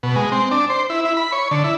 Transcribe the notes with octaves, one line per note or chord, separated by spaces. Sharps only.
B2
G#3
C4
D4
C5
E4
E4
B5
C#5
D3
E4